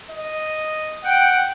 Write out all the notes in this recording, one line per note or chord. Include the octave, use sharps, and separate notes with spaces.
D#5
F#5 G5